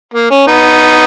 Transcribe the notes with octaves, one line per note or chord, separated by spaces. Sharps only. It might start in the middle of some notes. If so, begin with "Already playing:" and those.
A#3
C#4
B3 D#4